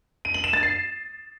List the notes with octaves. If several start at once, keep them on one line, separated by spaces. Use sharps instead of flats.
D#7
F#7
E7
A6
C7